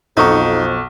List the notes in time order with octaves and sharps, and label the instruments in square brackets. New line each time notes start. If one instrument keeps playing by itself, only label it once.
[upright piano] B1 C#6 [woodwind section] F2 [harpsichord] D#4